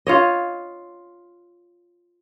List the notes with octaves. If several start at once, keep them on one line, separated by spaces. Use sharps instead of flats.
F4 C#5 D#5